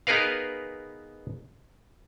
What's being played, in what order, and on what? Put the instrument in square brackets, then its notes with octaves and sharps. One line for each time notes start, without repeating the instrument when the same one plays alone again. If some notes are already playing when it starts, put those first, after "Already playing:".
[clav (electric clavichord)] B3 D#4 G#4 A#4 B4 F5